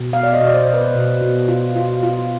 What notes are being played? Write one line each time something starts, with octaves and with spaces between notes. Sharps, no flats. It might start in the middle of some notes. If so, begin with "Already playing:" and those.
Already playing: B2
B3 F5
D5
D#5
B2 D5
C5
B2
B4
B2
B2
F4
F4
F4